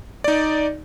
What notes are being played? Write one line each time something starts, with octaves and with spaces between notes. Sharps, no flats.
D#4 D5